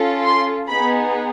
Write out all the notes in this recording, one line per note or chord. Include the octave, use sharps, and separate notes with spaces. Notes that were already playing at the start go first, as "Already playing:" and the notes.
Already playing: C#4 F4 A4
C6
B3 D#4 G#4 B5